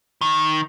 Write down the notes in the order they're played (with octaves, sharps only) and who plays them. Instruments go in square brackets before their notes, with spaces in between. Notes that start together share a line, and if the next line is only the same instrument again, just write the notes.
[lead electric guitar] D#3